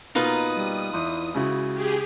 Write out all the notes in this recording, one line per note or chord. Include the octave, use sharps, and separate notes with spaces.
B2 A#3 D#4 F4 B4 D#6
G3
E2 E4 C6
C#2 C#3 E4 F#4
G4 G#4